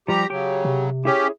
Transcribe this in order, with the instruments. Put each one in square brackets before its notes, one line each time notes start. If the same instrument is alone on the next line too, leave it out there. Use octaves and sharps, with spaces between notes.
[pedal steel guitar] F3 G3 [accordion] G4 A#5
[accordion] C#3 F#3 [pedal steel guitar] G4 D6
[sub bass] C3
[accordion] C#4 G4 [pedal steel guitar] E4 G#4 C#5